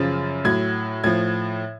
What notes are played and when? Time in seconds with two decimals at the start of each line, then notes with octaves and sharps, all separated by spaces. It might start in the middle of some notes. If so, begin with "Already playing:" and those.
Already playing: F#2 C#3 F3 A6
0.45 A2 F#3 G#6
1.04 A2 F3 G#6